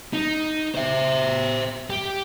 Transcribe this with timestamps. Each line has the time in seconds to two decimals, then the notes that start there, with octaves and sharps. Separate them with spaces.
0.14 D#4
0.75 C5 E5
1.90 G4